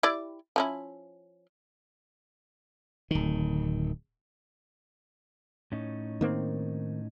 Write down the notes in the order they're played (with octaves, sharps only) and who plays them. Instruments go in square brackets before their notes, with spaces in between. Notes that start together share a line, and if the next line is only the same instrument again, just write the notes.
[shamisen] E4 G4 D5
F3 C#4 E4
[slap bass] D1 D#3
[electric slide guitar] A2 C#4 D#4
[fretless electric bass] D#3 A#3 C4